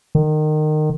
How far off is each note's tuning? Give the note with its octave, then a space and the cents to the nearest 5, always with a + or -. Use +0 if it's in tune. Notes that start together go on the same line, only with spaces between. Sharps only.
D#3 -25